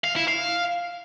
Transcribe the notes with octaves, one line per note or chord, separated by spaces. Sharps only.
F5
E4
F5